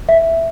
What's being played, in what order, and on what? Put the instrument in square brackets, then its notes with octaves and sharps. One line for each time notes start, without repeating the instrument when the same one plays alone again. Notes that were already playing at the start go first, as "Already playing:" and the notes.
[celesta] E5